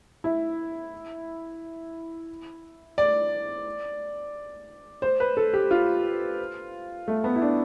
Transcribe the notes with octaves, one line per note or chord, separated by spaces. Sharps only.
E4
D5
C5
B4
A4
G4
F4
A3
B3
E4
D4